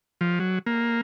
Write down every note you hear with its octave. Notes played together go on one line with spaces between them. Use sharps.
F3
F#3
A#3